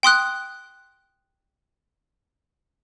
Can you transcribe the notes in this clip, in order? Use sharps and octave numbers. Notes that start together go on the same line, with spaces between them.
G5 C6 D#6 F#6